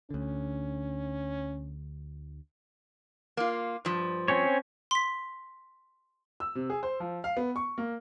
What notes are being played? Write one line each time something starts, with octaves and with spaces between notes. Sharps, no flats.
D2 D3 C#4
A#3 F4
G2 F3
C4 C#4 C#5
C6 B6
E6
C3
G#4
C5
F3
F5
B3
C#6
A#3